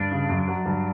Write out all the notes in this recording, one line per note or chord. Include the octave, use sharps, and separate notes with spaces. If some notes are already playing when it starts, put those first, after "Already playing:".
Already playing: G2 D4
C#3
F#2
F#3
G2